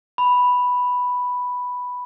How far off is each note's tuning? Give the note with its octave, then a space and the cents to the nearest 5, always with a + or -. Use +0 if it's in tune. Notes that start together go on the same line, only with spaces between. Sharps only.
B5 +0